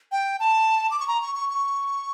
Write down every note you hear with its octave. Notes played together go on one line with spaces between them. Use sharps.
G5
A5
D6
C#6
A#5
C#6
C#6
C#6